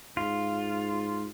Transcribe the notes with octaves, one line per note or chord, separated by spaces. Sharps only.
G#2 F4